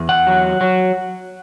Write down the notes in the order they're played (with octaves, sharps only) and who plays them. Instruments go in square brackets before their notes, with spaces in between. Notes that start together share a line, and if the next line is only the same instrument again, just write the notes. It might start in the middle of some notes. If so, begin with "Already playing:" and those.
Already playing: [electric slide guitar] E2
F#5
F#3
F#3